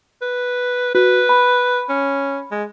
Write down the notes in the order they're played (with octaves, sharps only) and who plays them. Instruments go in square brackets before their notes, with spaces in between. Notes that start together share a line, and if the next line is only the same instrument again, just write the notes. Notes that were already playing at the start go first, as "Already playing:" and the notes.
[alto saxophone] B4
[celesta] F#4 [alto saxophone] B4
[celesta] B5
[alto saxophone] C#4
G#3